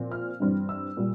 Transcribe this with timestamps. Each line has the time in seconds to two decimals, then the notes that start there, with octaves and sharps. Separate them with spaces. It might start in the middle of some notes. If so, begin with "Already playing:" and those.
Already playing: A#2 F3 C4
0.11 F6
0.40 G2 E3 G3 C4
0.69 E6
0.97 A#2 G3